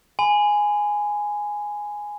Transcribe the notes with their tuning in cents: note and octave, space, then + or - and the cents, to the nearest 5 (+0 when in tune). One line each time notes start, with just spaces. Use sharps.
G#5 +0 B5 +35